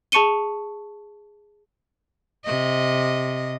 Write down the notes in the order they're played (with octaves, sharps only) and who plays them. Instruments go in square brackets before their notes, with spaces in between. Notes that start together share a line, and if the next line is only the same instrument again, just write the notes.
[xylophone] G#4 A5 C#6 C#7 D#7 G7
[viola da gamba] C3 D#5